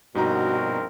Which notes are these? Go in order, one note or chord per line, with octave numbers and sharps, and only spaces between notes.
A#1 G2 B2 C4 D#4 F#4 A#4 A#5